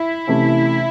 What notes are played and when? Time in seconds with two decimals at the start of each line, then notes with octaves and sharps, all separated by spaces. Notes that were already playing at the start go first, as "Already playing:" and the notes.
Already playing: E4
0.27 C3 E3 A3 C#4